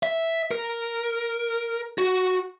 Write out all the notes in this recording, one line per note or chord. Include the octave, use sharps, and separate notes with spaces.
E5
A#4
F#4